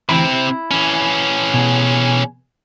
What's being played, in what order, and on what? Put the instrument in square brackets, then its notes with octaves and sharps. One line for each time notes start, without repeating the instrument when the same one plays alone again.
[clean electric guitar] D2 E3 B5 [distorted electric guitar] C3 C4
[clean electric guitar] E4
[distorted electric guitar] E3 C#4
[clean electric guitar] B2 G#4